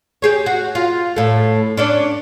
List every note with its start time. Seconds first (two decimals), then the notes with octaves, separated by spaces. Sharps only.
0.22 G4 G#4 C#5
0.46 F#4
0.75 F4
1.16 A2 A4
1.77 C#4 D4 D5